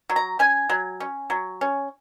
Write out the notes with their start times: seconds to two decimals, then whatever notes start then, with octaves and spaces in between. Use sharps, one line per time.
0.10 F#3
0.16 A#5
0.39 C#4 G#5
0.69 F#3
1.00 C#4
1.30 F#3
1.61 C#4